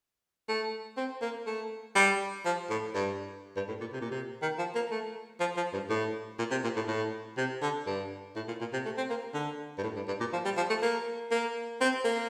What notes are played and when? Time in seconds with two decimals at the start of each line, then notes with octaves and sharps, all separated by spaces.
0.49 A3
0.98 C4
1.22 A#3
1.47 A3
1.96 G3
2.45 F3
2.70 A2
2.95 G2
3.56 G2
3.68 A2
3.81 A#2
3.93 C3
4.01 A#2
4.11 C3
4.42 D#3
4.59 F3
4.75 A#3
4.91 A3
5.40 F3
5.57 F3
5.73 G2
5.90 A2
6.39 A#2
6.51 C3
6.64 A#2
6.76 A2
6.88 A2
7.37 C3
7.62 D3
7.87 G2
8.36 A2
8.48 A#2
8.61 A#2
8.73 C3
8.85 A3
8.98 C4
9.10 A#3
9.34 D3
9.78 G2
9.83 A2
9.96 G2
10.08 G2
10.20 A#2
10.33 F3
10.45 G3
10.57 F3
10.70 A3
10.82 A#3
11.31 A#3
11.81 C4
12.05 A#3